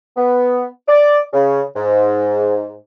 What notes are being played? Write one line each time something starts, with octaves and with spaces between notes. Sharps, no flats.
B3
D5
C#3
G#2